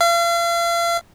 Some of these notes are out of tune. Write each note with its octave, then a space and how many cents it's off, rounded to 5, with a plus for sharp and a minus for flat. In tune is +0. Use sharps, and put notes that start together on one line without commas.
F5 -40